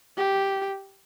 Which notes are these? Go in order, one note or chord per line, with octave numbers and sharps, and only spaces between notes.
G4